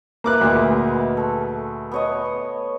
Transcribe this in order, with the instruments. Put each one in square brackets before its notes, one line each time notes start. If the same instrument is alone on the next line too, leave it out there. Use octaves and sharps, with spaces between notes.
[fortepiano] A#3 D6 F#6 [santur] A#4 B4 E5
[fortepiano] D2 A#2 [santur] G#3 G#5
[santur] A3 A4
B3 C#5 D#5